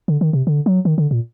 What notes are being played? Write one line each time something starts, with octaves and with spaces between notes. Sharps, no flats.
D3
D#3
C3
D3
F#3
D#3
D3
A#2